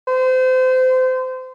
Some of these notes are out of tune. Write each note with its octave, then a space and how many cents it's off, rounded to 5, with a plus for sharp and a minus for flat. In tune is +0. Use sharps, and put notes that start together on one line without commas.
C5 -30